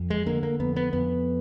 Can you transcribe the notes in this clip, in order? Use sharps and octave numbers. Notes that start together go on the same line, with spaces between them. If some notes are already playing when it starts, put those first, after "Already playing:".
Already playing: F2
G#3
D3 A#3
A#3
F2 B3
B3
F2 B3